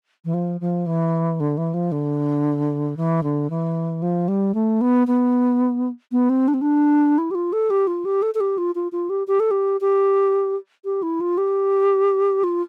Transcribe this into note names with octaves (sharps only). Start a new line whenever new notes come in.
E3
F3
F3
E3
D3
E3
F3
D3
E3
D3
E3
F3
G3
A3
B3
B3
B3
C4
D4
C4
D4
E4
G4
F4
A4
G4
F4
G4
A4
A4
G4
F4
F4
F4
G4
G4
A4
G4
G4
G4
E4
F4
G4
F4